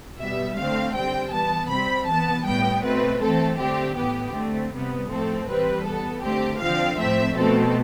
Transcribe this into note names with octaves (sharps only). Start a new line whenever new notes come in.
B2 G3 B3 E5
D3 A3 C4 F5
D3 G3 C4 G5
E3 B3 A5
C3 G3 C4 B5
E3 B3 A5
A2 G3 B3 G5
B2 A3 C4 B4
E3 A3 C4 A4
D3 A3 C4 G4
A2 E3 B3 G4
D3 A3 C4
C3 G3 B3
A2 F3 A3 C4 A4
E3 G3 C4 B4
E3 B3 A4
D3 A3 C4 G4
D3 F3 C4 F5
A2 F3 A3 C4 E5
B2 A3 C4 A4